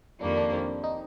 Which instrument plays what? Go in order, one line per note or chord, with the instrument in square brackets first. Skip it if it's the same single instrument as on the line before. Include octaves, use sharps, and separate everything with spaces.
[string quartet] F2 D#3 G3 A#3 [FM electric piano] D4
[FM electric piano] D4
C4
D#4